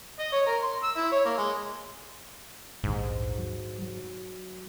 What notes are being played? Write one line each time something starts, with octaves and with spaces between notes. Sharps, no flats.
D#5
C#5
A#4
C6
E6
E4
C#5
A#3
G#3
A#1 D#2 G#2
F#3
F#3